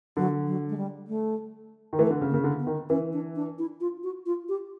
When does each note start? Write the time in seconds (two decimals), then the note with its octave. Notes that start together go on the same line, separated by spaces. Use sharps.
0.17 D3 F#3
0.47 F#3
0.69 G#3
0.77 G3
1.07 A3
1.93 D#3
1.98 E3 A3
2.10 D3
2.21 C#3
2.29 A#3
2.33 C#3
2.44 D3
2.59 B3
2.67 D#3
2.90 E3 C#4
3.13 D4
3.36 D4
3.58 E4
3.81 F4
4.04 F#4
4.26 F4
4.49 G4